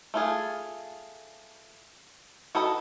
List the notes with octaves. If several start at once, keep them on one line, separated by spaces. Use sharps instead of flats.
A3 F4 G#4
F#4 A4 B4 D#5